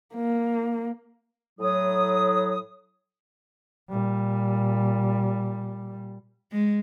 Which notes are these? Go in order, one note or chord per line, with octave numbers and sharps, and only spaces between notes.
A#3
A2 F#3 D#6
A#2 G3
G#3